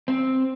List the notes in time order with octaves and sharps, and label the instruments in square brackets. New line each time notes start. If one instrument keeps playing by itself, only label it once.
[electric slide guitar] C4